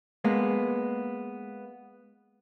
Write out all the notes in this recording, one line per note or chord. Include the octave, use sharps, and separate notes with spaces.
G#3 A#3 B3